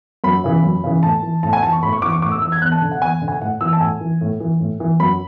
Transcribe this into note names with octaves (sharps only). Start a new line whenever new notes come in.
F#2 B5
C#3 E3
F#2
C#3 E3
A2 A5
E3
A2 A5
G#5
E3 A5
C#6
A2 B5
C#6
E3 D6
C#6
A2 D6
E6
E3 E6
G#6
E2 F#6
A5
D3
F#5
E2 G#5
D3
G#5
A2 F#5
E3 E6
A5
A2 G#5
E3
A2
E3
A2
E3
F#2 B5